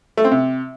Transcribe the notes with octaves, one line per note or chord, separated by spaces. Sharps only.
A3
C4
C3